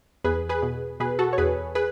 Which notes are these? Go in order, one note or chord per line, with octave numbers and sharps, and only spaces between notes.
E2 G#4 B4
G#4 B4
B2
B2 G#4 B4
F#4 A4
C#5
E2 G#4 B4
G#4 B4